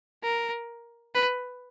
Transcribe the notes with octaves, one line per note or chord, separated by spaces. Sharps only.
A#4
B4